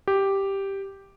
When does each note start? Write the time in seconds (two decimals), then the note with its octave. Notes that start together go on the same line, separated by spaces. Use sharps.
0.08 G4